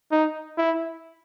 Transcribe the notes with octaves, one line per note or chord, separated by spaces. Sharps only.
D#4
E4